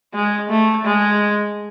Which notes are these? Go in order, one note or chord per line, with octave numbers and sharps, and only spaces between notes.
G#3
A3
G#3